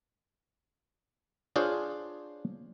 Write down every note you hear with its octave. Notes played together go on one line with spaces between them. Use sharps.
D4 F4 G#4 C5 C#5